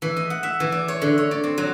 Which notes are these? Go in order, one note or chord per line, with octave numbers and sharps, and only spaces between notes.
E3
D#5
F#5
E5
E3
D5
C#5
D3
C#5
D5
C4
F#3